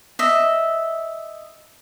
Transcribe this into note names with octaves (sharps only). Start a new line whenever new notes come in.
D#5 E5